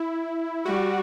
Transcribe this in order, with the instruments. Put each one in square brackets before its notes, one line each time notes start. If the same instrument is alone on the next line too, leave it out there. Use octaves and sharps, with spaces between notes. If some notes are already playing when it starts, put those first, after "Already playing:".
Already playing: [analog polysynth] E4
[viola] G3 [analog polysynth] F#4